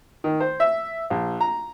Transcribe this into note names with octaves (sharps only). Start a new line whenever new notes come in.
D#3
C5
E5
A#1
A#5